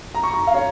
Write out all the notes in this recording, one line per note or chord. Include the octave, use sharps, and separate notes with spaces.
A#5
C#6
A#5
F5
C#5